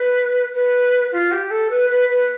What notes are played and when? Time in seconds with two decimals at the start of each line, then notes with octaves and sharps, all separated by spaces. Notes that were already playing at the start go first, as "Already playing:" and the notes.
Already playing: B4
0.54 B4
1.12 F4
1.32 G4
1.50 A4
1.70 B4
1.90 B4
2.09 B4